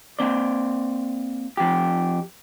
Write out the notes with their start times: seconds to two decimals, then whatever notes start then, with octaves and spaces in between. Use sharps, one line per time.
0.19 A#3 C4 D5
1.57 F2 G4